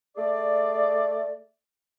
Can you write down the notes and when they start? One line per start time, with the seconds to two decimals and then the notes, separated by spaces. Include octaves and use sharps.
0.16 A3 G#4 D5